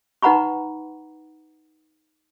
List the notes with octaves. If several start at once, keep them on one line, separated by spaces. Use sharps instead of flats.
D#4 B4 F#5 A#5 B5 C#6